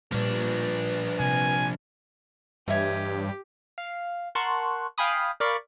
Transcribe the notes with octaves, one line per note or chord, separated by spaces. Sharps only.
A#2 F3 G3 D4 B4
C3 G#5
G2 E3 G4 C#5 D#5 E5
F5
A#4 F#5 A5 C6 C#6 F#6
F5 G5 G#5 B5 D#6
A#4 D5 F5 B5 C#6